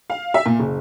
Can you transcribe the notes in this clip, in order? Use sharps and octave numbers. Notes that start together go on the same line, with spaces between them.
F5
E5
A#2
F#1